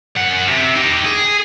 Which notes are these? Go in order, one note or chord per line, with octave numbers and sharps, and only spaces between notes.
F#2 F#5
C3
D#4 G4
G#4